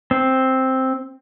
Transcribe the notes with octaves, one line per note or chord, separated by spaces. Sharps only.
C4